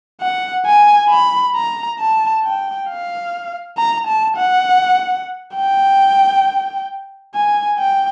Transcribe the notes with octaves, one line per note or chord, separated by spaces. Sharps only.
F#5
G#5
B5
A#5
A5
G5
F5
A#5
A5
F#5
G5
G#5
G5